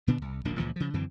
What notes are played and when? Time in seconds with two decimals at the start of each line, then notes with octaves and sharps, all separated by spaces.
0.07 A#2 D3 B3 D4
0.21 C2
0.45 D1 A#1 A#3 D4
0.58 C#2 A#2 E3 F3
0.76 C#3 F3
0.93 F#2 D3 E3 C4